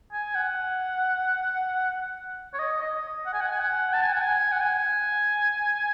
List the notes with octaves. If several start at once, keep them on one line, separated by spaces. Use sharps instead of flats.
G#5
F#5
C#5
D#5
D#5
F#5
G#5
F#5
G#5
F#5
A5
G#5
F#5
G#5
F#5
G#5